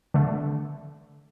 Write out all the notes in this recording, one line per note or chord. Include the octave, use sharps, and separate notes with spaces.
D3 A3